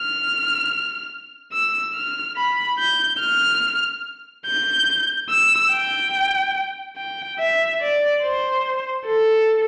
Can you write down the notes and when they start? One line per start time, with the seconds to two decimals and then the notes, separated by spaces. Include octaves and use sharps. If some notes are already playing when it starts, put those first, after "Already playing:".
Already playing: F6
1.53 E6
1.95 F6
2.37 B5
2.79 G6
3.20 F6
4.46 G6
5.30 E6
5.71 G5
6.97 G5
7.39 E5
7.81 D5
8.23 C5
9.06 A4